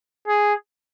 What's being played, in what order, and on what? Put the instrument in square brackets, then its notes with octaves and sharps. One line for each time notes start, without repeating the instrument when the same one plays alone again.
[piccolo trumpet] G#4